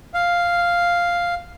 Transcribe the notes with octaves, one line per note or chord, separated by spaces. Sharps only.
F5